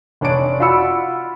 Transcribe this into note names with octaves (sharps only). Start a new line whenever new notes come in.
F1 D4 C#5 D5 D7
F4 F#4 B5 E6 C#7